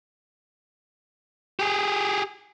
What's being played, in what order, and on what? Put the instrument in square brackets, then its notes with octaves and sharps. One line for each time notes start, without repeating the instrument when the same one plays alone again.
[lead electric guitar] G4 G#4